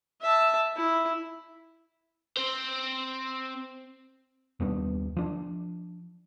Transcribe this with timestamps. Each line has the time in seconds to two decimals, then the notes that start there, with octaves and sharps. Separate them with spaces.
0.21 E5 A5
0.76 E4
2.37 C4 C5
4.60 D#2 G3 B3 D4
5.17 F3 D4